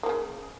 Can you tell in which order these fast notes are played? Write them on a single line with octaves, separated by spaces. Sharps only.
A#3 F3 C#3